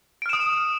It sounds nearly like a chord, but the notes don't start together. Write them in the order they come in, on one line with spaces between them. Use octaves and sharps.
D7 F6 E7 D#6